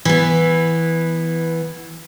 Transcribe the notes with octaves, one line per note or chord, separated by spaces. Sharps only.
E3 B3